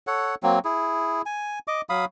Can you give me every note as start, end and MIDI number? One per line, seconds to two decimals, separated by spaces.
0.07 0.35 69
0.07 0.35 73
0.07 0.35 78
0.43 0.59 54
0.43 0.59 58
0.43 0.59 60
0.65 1.22 64
0.65 1.22 68
1.26 1.59 80
1.68 1.81 75
1.68 1.81 86
1.90 2.05 54
1.90 2.05 77
1.90 2.05 83
1.90 2.05 87